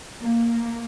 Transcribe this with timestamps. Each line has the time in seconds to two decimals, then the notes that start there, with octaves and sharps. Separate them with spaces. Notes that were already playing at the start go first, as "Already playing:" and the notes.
0.20 A#3